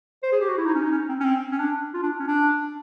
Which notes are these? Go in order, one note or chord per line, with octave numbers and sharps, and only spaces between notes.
C5
G#4
G4
F#4
E4
D#4
C#4
D#4
C#4
C4
C#4
C4
C#4
D4
F4
D4
C#4
D4